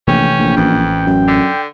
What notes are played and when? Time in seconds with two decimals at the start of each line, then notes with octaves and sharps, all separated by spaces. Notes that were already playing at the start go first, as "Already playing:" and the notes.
0.08 A#1 C3 E3 A3 C#4 G5
0.39 A#1
0.57 A1 F2 E3 C#4
1.06 F#2
1.28 D3